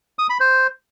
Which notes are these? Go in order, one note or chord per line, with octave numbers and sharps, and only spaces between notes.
D#6
B5
C5